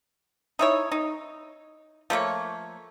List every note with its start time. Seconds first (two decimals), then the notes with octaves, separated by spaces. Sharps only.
0.59 D#4 E4 C#5
0.92 D#4
2.10 F3 A3 A#3 C#5